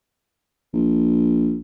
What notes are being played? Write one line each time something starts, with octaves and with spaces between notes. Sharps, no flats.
A#1